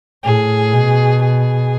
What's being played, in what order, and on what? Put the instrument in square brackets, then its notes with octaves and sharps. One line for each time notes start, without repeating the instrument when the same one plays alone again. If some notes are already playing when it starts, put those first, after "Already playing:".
[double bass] A2 [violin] G#4
[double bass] B2
[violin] G#4